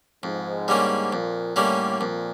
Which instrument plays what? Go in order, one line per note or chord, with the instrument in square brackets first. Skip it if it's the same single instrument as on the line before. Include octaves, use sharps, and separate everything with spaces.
[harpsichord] F2 [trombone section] G#2
[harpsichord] D3 G3 A#3 C#4
[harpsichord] F2 [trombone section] A#2
[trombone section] A2 [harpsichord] D3 G3 A#3 C#4
[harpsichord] F2 [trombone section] A#2